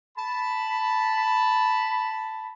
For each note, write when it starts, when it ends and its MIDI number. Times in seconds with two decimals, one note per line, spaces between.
0.18 2.53 81
0.18 2.53 83